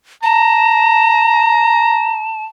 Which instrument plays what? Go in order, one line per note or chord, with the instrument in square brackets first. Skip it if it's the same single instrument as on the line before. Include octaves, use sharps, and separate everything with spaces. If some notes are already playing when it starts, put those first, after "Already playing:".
[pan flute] A5 [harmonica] A#5